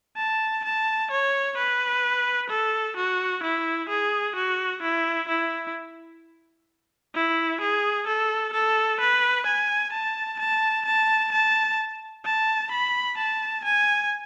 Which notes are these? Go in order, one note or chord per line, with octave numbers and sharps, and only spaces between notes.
A5
A5
C#5
B4
A4
F#4
E4
G#4
F#4
E4
E4
E4
G#4
A4
A4
B4
G#5
A5
A5
A5
A5
A5
B5
A5
G#5